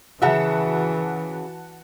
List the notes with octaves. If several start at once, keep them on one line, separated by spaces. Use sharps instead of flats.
C#3 E3 F#4 E5 F#5 A5